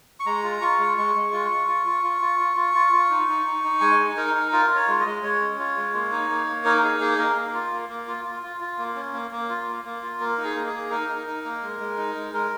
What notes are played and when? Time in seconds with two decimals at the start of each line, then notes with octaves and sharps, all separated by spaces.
0.20 C#6
0.26 G#3 A#5
0.43 F4
0.61 F4 C#6
0.79 G#3
0.97 G#3 C#6
1.15 G#3
1.33 F4
1.51 F4
1.68 F4
1.86 F4
2.04 F4
2.21 F4
2.39 F4
2.56 F4
2.74 F4
2.92 F4
3.10 D#4
3.28 D#4
3.46 D#4
3.64 D#4
3.81 G#3 G#5
3.99 D#4
4.17 D#4 A#4
4.34 D#4
4.52 F4 A#4
4.70 F4
4.76 C#5
4.88 G#3
5.00 D#5
5.05 G#3
5.23 G#3 C#5
5.41 C#4
5.59 F4
5.77 G#3
5.94 A#3
6.12 D#4
6.30 A#3
6.48 A#3
6.65 D#4 A#4
6.83 D#4 G#4
7.00 A#3 G#4
7.18 A#3 A#4
7.36 A#3
7.54 F4
7.72 A#3
7.89 A#3
8.07 F4
8.25 F4
8.43 F4
8.60 F4
8.78 A#3
8.95 C#4
9.13 A#3
9.31 A#3
9.49 F4
9.67 A#3
9.85 A#3
10.02 F4
10.20 A#3 A#4
10.38 D#4
10.44 G#4
10.55 A#3
10.67 G#4
10.73 A#3
10.90 D#4 A#4
11.09 D#4
11.26 D#4
11.45 A#3
11.62 G#3
11.80 G#3
11.98 D#4
12.15 G#3
12.33 G#3 A#4